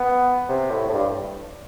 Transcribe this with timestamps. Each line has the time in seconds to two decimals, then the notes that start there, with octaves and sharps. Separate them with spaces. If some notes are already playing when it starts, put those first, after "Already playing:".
Already playing: B3
0.49 C3
0.71 A2
0.89 A2
0.93 G2